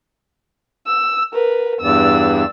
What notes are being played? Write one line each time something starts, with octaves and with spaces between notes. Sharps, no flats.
E6
A#4 B4
E2 G2 D5 E6